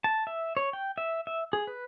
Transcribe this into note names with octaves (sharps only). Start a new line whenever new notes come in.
A5
E5
C#5
G5
E5
E5
G#4
B4